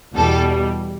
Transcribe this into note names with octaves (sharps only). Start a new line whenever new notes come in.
E2 B2 G3 A4